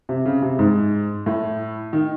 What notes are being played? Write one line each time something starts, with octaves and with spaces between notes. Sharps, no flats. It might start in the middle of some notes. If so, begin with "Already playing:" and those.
C3
C#3
C3
G#2
A2
D#3